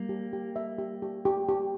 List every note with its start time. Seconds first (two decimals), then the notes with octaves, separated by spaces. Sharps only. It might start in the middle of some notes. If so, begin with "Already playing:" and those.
Already playing: G3 A#3
0.09 G4
0.33 G4
0.56 E5
0.78 G4
1.02 G4
1.25 G4
1.49 G4